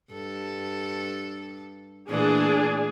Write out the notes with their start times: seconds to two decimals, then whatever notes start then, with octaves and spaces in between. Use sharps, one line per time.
0.13 G2 A4
2.09 A#2 E3 A3 D4 G#4